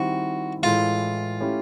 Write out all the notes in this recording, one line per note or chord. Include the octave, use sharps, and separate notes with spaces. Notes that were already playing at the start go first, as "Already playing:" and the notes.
Already playing: D#3 G3 C4 E4 F#4
A2 E3 G#3 F4
A3 C#4 E4 G4